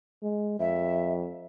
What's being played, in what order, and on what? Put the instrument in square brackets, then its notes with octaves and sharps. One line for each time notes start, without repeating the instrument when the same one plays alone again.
[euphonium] G#3
[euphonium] F2 [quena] E5